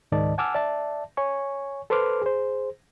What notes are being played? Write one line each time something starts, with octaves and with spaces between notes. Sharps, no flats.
C#2 G#2 D#3 D5 D#5 A5
F#5 G#5 A5 D6 E6 F6
D5 E5 A5
C#5 G#5 C#6
A4 B4 C5 C6 D6 F6
G#4 C5